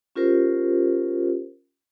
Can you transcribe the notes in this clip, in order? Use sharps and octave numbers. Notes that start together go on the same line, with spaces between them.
C#4 F4 G4 A#4 C5